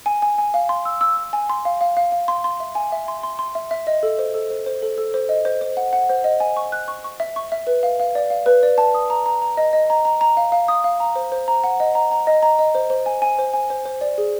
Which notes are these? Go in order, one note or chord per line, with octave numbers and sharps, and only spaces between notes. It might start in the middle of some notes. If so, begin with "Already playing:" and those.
G#5
G#5
G#5
F5
C6
E6
E6
E6
G#5
C6
F5
F5
F5
F5
C6
C6
E5
G#5
E5
C6
C6
C6
E5
E5
D#5
A4
C5
A4
C5
C5
A4
A4
C5
D#5
C5
C5
F#5
F#5
C5
D#5
G#5
C#6
F#6
C#6
C#6
E5
C#6
E5
B4
F5
F5
D5
F5
B4
D5
A5
D#6
A#5
A#5
A#5
D#5
D#5
A#5
A#5
A#5
F5
F5
D#6
F5
A#5
C5
C5
A#5
F#5
D#5
A#5
A#5
D#5
A#5
D#5
C5
C5
G#5
G#5
C5
G#5
C5
C5
D5
G#4